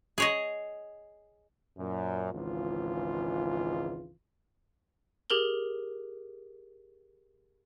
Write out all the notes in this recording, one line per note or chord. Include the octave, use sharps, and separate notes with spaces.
G#4 C#5 D#5
F#2 A#2
G#1 C#2 E3 F4
G4 G#4 A#4 F#7 G7